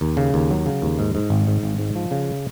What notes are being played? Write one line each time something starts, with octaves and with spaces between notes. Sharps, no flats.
D#2
C#3
D#2
F#3
C#3
D#2
G#2
G#2
G#1
G#2
G#1
G#2
F3
C#3